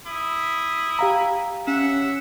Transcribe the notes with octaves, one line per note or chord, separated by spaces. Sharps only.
E4 D#6
G4 F5 A#5
C#4 E5 F#5